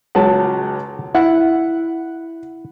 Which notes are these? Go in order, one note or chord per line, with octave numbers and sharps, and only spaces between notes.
C#2 F#3 F#5 A5
E4 F#5